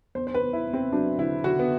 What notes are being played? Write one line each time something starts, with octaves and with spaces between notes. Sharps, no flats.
E2 C5
C5
B4
E2
E4
E2
C4
F#3 D4
D3 E4
D3 F#4
B3